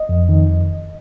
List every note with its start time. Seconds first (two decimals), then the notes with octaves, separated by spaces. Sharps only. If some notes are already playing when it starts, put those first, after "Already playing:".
Already playing: D#5
0.09 F2
0.29 D#3